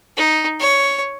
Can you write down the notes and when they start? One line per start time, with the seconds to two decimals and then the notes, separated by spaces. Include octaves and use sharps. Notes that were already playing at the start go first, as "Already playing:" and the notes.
0.17 D#4
0.60 C#5